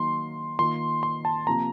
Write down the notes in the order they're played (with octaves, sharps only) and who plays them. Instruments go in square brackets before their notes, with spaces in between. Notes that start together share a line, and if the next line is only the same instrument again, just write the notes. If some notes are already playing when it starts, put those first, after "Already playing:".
Already playing: [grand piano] D#3 F#3 A#3 D#4 [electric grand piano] C6
[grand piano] D#3 A#3 F4 [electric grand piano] C6
[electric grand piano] C6
A5
[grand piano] C3 F3 A#3 [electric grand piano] A#5